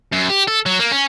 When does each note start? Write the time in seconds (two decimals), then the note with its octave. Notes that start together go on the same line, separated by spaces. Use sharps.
0.12 F#2
0.29 G4
0.47 A4
0.66 F#3
0.80 A#3
0.92 C#4